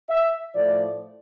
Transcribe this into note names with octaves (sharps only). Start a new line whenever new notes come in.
E5
A2 F3 A3 D5